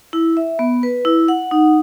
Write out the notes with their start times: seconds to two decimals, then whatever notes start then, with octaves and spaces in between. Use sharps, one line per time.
0.13 E4
0.37 E5
0.59 B3
0.83 B4
1.05 E4
1.28 F#5
1.51 D#4